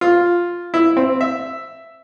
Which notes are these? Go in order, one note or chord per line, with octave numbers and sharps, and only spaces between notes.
F4
E4
C4
E5